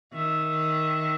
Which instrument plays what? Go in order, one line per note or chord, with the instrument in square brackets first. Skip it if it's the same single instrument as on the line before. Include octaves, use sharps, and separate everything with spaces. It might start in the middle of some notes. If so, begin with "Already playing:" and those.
[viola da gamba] D#3 [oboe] E5